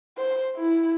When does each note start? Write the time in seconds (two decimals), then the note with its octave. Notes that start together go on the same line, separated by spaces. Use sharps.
0.18 C5
0.57 E4